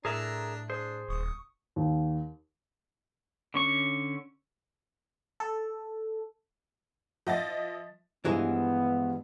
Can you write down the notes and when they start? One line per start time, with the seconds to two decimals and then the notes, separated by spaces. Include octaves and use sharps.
0.05 A2 D4 G#4 A#4 E5 A#5
0.70 D4 G#4 C5
1.09 D#1 C#6 D#6
1.76 D#2
3.54 D3 C#4 C#6
5.40 A4
7.27 F3 D#5 E5 A6
8.25 G2 E3 F3 G#3 B3